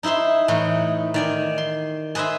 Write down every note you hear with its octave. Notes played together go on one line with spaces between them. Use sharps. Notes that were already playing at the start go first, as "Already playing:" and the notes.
D#4 E4 C5 E5 C6
A2 E3 D#4
D#3 D5 G#5
C6
G#4 B4 C5 D#5 E5